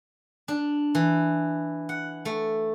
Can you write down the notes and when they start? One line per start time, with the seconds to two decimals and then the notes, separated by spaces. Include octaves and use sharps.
0.48 D4
0.95 E3
1.89 F#5
2.25 A3